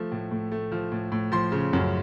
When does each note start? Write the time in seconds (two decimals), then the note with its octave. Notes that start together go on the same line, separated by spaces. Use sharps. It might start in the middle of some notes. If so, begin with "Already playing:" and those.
Already playing: F3 A3
0.12 A2
0.31 A2
0.52 A3
0.72 F3
0.92 A2
1.12 A2
1.32 F3 C6
1.52 C#3
1.73 F#2